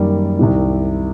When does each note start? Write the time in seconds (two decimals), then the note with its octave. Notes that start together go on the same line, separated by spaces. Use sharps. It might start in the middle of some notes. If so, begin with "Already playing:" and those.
Already playing: F#2 D#3 G3 A#3 D5
0.39 C2 C3 D#3